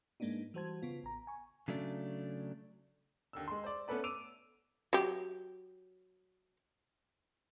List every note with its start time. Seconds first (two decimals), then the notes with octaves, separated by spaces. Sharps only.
0.20 G#2 G#3 A#3 B3 D4 D#4
0.54 E3 G3 F#4 C5 A5 G#6
0.82 C#3 B3 F4
1.03 A1 A#5
1.27 G#5 C#6
1.68 C#3 F#3 A3 D4
3.33 D#2 D3 E6
3.48 G#3 C6
3.64 C5 D5
3.88 A3 B3 C#4 A4 B4 D5
4.04 D6 E6 D7 D#7 F7
4.93 F#3 G4